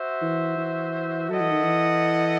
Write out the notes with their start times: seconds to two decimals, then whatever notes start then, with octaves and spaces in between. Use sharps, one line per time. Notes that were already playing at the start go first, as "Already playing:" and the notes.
Already playing: F#4 C5 E5
0.21 E3
0.57 E3
1.29 F#3 E4 A4 D#5 F#5
1.40 E3
1.51 D#3
1.63 E3